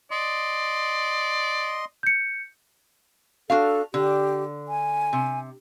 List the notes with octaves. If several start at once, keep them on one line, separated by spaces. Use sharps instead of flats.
D5 D#5 C6
G6 C#7
D4 F#4 A4 F5
D3 G4
G#5
C3